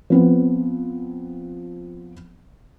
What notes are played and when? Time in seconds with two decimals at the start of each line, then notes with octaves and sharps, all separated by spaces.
0.10 F3 B3 C4